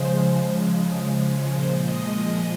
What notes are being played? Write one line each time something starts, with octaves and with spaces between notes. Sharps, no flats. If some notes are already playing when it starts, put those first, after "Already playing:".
Already playing: C#3 F3 G#3 C5
C#3 F3 G#3
A#2 F3 G#3 C5
D#5
D#5